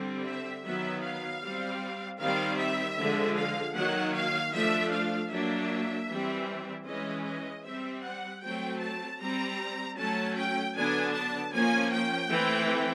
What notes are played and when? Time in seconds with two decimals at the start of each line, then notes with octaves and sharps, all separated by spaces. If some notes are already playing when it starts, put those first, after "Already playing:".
Already playing: D3 G3 C4
0.25 E5
0.63 D#3 F#3 B3 E5
1.03 F5
1.42 G3 C4
2.19 D#3 G3 C4 F5
2.58 E5
2.97 D3 F3 G#3
3.35 F5
3.75 D#3 F#3 A#3 F#5
4.14 F5
4.52 F3 A3 D4 E5
4.91 F5
5.30 F#3 A#3 D4 E5
6.08 E3 G3 C4
6.86 E3 G#3 C#4 D#5
7.25 D#5
7.64 G3 C4 E5
8.03 F#5
8.42 F#3 A3 C4 G5
8.81 A5
9.19 G3 C4 A#5
9.97 F#3 A3 C#4 A5
10.35 G5
10.75 D3 F#3 B3 D4 G#5
11.13 A5
11.52 F3 A#3 C#4 G#5
11.91 G5
12.31 E3 A3 C4